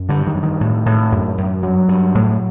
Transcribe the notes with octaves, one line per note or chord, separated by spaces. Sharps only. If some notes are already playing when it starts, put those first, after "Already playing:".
Already playing: F#2
G2 D3
D#3
G2
D#3
A2
A2
F#2
F#2
G2 F#3
G2
A2